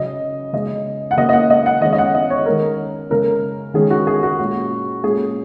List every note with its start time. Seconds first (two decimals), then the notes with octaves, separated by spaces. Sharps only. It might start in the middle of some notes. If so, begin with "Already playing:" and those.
Already playing: C#3 F#3 C#4 D#5
0.53 C#3 G#3 C#4 D#5
1.11 F#5
1.17 C#3 F#3 A#3 D#5
1.29 D#5
1.33 F#5
1.50 D#5
1.66 F#5
1.81 D#3 G#3 C#4 D#5
1.93 D#5
1.98 F#5
2.14 D#5
2.30 C#5
2.46 D#3 G#3 C#4 A#4
3.10 C#3 G#3 C#4 A#4
3.74 D#3 G#3 C#4 G#4
3.90 F#4
4.07 G#4
4.23 F#4
4.38 A#2 G#3 C#4 F#4
5.03 A#2 G#3 C#4 G#4